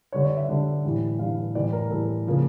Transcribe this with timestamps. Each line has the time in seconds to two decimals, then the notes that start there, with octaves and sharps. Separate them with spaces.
0.12 D3 G3 D4 C#5
0.24 D5
0.37 E5
0.49 D3 G3 D4
0.84 A2 E3 G3 D4
1.19 A2 E3 G3 D4 F5
1.55 A2 E3 G3 D5
1.73 A#4
1.91 A2 E3 G3 A4
2.27 C#3 F3 A#3